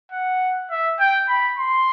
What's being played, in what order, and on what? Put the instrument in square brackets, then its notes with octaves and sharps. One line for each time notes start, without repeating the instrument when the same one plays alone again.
[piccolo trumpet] F#5
E5
G5
B5
C6